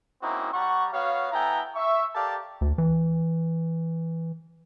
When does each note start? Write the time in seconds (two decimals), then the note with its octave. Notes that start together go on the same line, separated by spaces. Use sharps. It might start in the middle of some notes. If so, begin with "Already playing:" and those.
0.22 A#3 C4 C#4 D#4 E4 F#4
0.53 G3 F#5 A#5 C#6
0.92 B3 F#4 C#5 F5
1.32 B3 E4 A4 G5 G#5 A#5
1.75 E5 C#6
2.15 G4 A4 A#4 D5 F5 A5
2.61 D2
2.78 E3